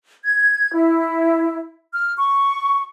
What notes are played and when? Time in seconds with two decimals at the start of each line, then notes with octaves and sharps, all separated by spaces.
0.23 G#6
0.74 E4
1.93 F6
2.17 C#6